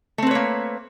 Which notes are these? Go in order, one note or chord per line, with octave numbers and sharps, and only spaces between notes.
A3 A#3 C4 B4 C#5